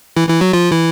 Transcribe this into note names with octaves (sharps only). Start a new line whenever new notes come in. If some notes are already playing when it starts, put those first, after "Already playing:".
E3 E4
E3 E4
F#3 F#4
F3 F4
E3 E4